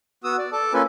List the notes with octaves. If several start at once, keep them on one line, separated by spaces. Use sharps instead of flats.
B3 F#4 D#6 E6
D5
A4 A5 D6
A#3 C#4 F4 A4 B4 G#5